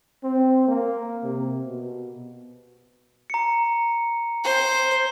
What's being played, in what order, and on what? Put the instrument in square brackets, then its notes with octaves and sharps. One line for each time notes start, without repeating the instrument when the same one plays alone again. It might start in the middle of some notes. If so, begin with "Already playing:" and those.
[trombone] C4
A#3
C3
B2
[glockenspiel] A#5 C#7
[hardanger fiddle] C5